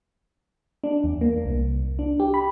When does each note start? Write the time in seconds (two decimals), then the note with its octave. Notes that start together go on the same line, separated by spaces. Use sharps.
0.84 D4
1.04 E2
1.21 A#3
1.45 C2
1.99 D4
2.20 G4
2.34 B5